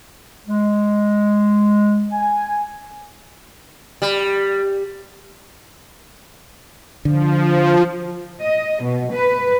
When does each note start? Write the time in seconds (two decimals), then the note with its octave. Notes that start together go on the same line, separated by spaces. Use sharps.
0.47 G#3
2.11 G#5
4.02 G3
7.05 D3 F3
8.42 D#5
8.83 B2
9.13 B4